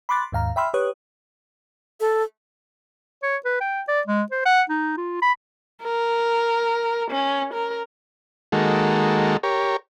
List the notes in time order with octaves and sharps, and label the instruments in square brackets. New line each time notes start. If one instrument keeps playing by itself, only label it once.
[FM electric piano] B5 C6 D6 F#6 A6
D#2 G#2 F5 A#5
E5 G5 B5 C6 E6 F6
G4 B4 C#5 D#6 F#6
[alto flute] A4
[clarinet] C#5
B4
G5
D5
G#3
C5
F#5
D#4
F4
B5
[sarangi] A#4
C#4
A#4
[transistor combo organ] D#3 G#3 A#3 F#4 A4
G4 A#4 C#5